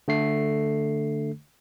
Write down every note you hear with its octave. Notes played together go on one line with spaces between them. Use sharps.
D3 A3 C7